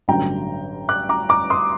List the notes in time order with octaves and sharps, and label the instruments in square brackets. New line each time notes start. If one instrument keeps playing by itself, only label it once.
[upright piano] A1 G2 D3 F#3 G5 A#5
D6 F#6
A#5 D6
A#5 D6
C6 D#6